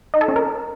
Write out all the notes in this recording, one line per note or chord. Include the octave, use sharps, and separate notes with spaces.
D#4
A4
C#4
A#4